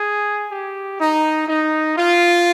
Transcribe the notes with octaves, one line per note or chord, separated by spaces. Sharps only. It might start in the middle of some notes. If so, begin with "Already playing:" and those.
Already playing: G#4
G4
D#4
D#4
F4